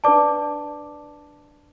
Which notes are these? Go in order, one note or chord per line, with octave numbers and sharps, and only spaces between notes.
D4 B4 D5 A5 D6